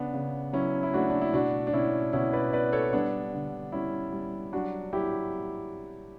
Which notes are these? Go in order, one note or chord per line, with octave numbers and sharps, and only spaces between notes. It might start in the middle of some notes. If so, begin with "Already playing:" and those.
Already playing: C#3 B3 D4
C#3
F#3 C#4 E4
E4
A3 D4 F#4
D4
E4
B2 D4 F#4
D4
B2 C#4 E4
B2 C#4 E4
B4 D5
B3 B4 D5
A4 C#5
G3 B3 D4
D3
G3 C#4 E4
G3
F#3 D4 F#4
F#3 E4 G4